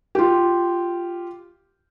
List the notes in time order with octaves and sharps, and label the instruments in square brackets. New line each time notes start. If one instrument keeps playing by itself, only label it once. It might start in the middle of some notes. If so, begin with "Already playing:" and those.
[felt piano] F4 G4